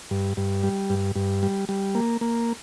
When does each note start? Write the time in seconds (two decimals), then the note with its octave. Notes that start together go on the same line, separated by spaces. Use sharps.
0.11 G2
0.37 G2
0.63 G3
0.90 G2
1.16 G2
1.43 G3
1.69 G3
1.95 A#3
2.21 A#3